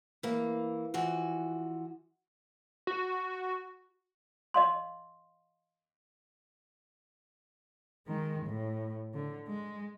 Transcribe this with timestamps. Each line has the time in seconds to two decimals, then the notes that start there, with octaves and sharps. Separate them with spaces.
0.23 E3 A#3
0.94 E3 F3 F#4
2.87 F#4
4.54 D#5 F5 C6
8.07 D#3 G#3
8.46 A2
9.14 D3
9.47 G#3